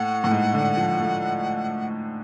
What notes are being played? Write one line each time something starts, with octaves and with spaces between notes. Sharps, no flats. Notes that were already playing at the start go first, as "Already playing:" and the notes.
Already playing: A2 F#5
A2
G#2
D3
F3
A3